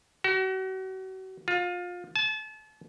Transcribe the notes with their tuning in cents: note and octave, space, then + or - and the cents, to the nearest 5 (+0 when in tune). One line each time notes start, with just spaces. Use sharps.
F#4 +40
F4 +25
A5 -35